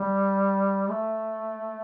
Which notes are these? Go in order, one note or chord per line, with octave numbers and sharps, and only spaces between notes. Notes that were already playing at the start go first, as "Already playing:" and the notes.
Already playing: G3
A3